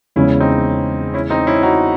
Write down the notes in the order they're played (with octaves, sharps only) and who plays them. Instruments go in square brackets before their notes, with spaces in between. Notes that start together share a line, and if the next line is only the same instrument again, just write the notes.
[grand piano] E2 C#3 G#3 [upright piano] C#4 E4
[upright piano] C4 D#4
C#4 E4
C4 D#4
C#4 E4
D#4 F#4